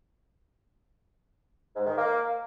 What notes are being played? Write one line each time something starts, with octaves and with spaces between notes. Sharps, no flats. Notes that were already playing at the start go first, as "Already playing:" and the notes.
G#2
D#3
A#3